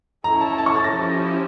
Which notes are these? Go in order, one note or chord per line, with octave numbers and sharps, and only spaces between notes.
C#4 E4 A4 C#5 A#5
A5
A5
C#6
A6
A#6
F3 C#4 E4 G4